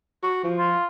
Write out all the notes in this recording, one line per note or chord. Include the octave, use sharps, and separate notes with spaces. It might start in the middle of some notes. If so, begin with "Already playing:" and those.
F#4
F3
F4